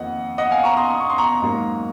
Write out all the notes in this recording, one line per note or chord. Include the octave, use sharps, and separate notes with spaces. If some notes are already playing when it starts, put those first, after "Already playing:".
Already playing: F2 D#3 A#3 D#5 F#5
D#5 F#5
F5 G#5
A#5 C#6
C6 D#6
D#6
C#6
C6
A#5 C#6
G#2 F#3 A#3